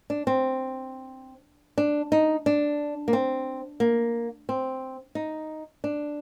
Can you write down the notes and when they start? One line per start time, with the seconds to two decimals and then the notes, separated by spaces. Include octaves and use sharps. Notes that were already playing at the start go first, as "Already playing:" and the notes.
0.10 D4
0.27 C4
1.78 D4
2.12 D#4
2.46 D4
3.08 A#3
3.13 C4
3.80 A#3
4.49 C4
5.15 D#4
5.84 D4